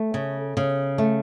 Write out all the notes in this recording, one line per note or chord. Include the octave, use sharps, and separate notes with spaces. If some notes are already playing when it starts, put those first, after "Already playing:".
Already playing: A3
C#3
C#3
A3